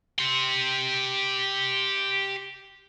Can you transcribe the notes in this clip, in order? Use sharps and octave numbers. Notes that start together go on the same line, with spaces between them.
G4 C6